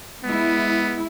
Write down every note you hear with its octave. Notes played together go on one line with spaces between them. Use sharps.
G#3 B3 E4